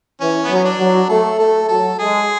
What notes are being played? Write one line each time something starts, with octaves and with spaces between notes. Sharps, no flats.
E3 C#4
F#3 B3
C#4
D4
F#3
A3 A4
A3 A4
F#3 A4
G#3 G#4